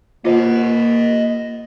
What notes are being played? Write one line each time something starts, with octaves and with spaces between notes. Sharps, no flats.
A#3 F4 C5 D#5 F#5